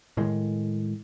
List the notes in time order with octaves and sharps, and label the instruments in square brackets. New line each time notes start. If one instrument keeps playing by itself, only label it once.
[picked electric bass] A2 D#3 G#3